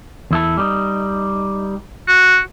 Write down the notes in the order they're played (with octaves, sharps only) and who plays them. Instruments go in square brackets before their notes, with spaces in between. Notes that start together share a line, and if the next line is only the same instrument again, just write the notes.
[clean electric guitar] E2 E4 A4
G3 D#4
[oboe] F#4